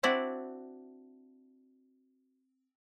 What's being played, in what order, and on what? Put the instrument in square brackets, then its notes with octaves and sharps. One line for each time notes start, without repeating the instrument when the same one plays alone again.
[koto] C4 D4 E4 F#4 D5